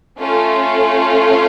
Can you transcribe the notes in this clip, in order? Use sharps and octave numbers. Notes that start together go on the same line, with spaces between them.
A3 C#4 F4 A4